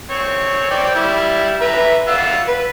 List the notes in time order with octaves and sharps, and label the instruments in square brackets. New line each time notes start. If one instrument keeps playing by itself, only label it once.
[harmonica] C4 C#5
C5 D5 G5
G3 E4
B4 E5 A#5
F4 F#5 E6
B4